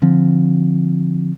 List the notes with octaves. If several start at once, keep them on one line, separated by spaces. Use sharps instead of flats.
D3 F3 C4